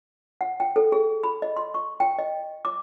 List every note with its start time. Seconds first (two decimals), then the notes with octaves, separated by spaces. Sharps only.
0.41 F#5
0.60 G5
0.76 A4
0.92 G#4
1.23 B5
1.42 D#5
1.57 C6
1.74 C#6
2.00 G5
2.19 D#5
2.65 D6